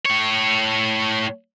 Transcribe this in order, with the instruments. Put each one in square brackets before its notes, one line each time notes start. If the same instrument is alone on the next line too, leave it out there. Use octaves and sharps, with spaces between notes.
[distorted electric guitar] A2 C#5